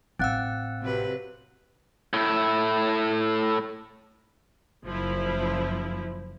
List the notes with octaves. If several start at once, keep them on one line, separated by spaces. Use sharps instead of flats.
A1 C4 F5 F#5 E6 F#6 A6
C3 F#3 B4
A2 E4
F#1 F3 E4